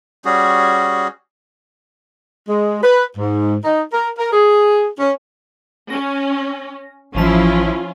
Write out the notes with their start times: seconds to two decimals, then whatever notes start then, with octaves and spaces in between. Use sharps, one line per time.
0.25 G3 C#4 F#4 G#4
2.49 G#3
2.82 B4
3.17 G#2
3.64 D#4
3.93 A#4
4.18 A#4
4.33 G#4
4.99 C#4
5.90 C#4 A#6
7.15 A1 E3 F3 C#4 E4 F4 A5